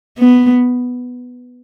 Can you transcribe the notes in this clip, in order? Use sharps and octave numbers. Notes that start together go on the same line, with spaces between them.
B3